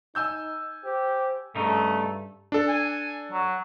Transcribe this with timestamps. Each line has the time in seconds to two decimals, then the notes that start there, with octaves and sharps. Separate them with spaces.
0.15 D#4 G#5 E6 G6
0.85 G4 C5
1.55 G2 C#3 A3 D#4
2.52 D4 A4
2.68 G#5
3.32 F#3